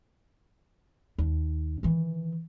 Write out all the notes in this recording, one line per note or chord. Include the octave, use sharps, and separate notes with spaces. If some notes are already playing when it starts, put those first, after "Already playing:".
D#2
D#3 E3